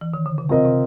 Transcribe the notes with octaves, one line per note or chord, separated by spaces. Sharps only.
E3
D#3
D3
C#3
C3 C4 F4 A#4 D#5
C3